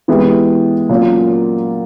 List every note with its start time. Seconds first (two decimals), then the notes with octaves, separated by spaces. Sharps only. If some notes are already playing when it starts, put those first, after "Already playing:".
0.08 E3 G#3 B3 E4 G4
0.89 A#2 F#3 A#3 C#4 F4